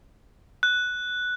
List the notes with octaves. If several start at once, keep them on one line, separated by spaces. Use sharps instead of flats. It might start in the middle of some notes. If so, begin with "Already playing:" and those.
F#6